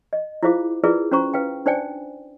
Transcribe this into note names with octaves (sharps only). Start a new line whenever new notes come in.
D#5
E4 F4 G#4 C5 F5 D6
E4 F4 G#4 A#4 B4 D5
C#4 F#4 C5 A#5 C#6
B4 F5 G5
D4 D#4 C5 D5 G5 G#5